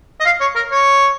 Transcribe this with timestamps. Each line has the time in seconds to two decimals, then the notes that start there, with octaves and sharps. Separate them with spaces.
0.20 D#5
0.25 F5
0.41 C#5
0.56 A#4
0.71 C#5